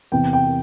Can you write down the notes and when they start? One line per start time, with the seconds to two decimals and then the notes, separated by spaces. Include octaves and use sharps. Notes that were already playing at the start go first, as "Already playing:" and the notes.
0.12 E2 C3 E3 G5
0.33 G5